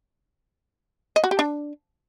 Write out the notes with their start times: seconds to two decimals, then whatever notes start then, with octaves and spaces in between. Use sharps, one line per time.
1.16 D#5
1.24 F#4
1.31 G4
1.39 D4